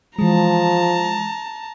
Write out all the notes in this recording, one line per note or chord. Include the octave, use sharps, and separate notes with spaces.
E3 F3 G#3 A5 A#5